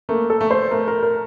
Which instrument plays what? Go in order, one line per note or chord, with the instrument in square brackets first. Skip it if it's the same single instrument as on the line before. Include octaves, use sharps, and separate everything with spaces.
[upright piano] A3 [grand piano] A#3
[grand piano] A4
[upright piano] A3
[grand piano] C5
[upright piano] A3 [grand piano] A#4
[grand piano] A#4
A#4